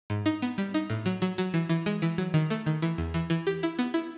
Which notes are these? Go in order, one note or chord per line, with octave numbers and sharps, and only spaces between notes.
G#2
D#4
B3
G3
D#4
A2
F#3
F#3
F#3
E3
E3
G#3
E3
F#3
D#3
A3
D#3
E3
E2
E3
E3
G4
E4
B3
E4